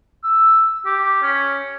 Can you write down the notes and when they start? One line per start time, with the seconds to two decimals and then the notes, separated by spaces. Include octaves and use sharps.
0.24 E6
0.86 G4
1.23 C#4